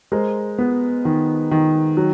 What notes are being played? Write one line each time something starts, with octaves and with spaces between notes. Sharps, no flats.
G#3 A#4 C5
B3
D#3
D#3
F#3